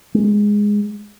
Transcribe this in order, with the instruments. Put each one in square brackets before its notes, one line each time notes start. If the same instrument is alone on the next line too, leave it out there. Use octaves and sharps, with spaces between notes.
[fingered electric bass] G#3